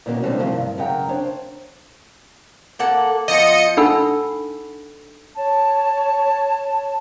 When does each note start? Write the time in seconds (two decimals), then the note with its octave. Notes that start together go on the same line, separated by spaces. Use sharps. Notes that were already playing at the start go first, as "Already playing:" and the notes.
0.06 A#2 D#3 A#3 B3 C#4 F#4
0.23 F#3 G3 A3 C4 D4
0.39 C3 D#3 F3 F#3 G#3
0.53 G2
0.78 F#2 C#3 A#4 F#5 G5 A#5
1.08 D4 C5 C#5
2.79 A#3 A4 F#5
3.28 F3 B3 F4 D#5 C#7
3.77 D4 D#4 A4 F#5 B5 E6
5.36 C#5 A5